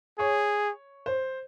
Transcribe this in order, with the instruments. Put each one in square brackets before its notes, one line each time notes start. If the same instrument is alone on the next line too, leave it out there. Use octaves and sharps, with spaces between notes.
[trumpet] G#4 [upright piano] C#5
[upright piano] C5